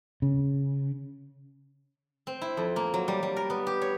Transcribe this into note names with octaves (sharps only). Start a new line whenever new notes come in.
C#3
C4
E4
F2
A#3
F#3
G3
G3
A#4
B3
G4
C#5